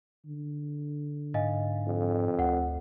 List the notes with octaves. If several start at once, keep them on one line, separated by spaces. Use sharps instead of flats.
D3
G#2 D#5 F5 G#5
F2
D2 F#5